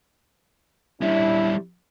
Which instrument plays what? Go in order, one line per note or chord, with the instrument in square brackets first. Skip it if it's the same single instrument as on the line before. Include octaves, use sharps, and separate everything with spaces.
[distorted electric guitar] G3 C#4 [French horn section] D4 E4